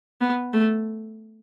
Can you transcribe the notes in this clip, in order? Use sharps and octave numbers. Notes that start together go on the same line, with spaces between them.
B3
A3